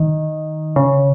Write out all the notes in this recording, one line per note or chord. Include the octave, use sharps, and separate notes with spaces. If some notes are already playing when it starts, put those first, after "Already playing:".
Already playing: D#3
C#3